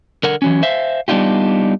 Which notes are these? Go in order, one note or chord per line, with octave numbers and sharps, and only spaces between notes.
D3 A#4 F#5
E3 F#3 C#4
C5 E5 F5
G3 B3 D4 D#4 F4 G4